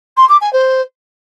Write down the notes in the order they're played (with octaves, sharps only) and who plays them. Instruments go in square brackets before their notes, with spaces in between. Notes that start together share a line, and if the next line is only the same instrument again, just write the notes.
[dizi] C6
D6
G#5
C5